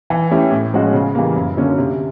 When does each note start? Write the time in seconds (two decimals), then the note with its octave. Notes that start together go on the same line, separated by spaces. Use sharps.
0.10 E3
0.31 A3 C#4 E4 G4
0.52 A2
0.73 F3 G#3 C#4 F#4
0.94 C#3
1.15 E3 G3 A#3
1.36 F#2
1.57 D3 F#3 A#3 C#4
1.78 C3